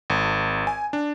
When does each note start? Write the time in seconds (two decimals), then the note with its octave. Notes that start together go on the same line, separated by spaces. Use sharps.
0.10 G#1
0.67 G#5
0.93 D4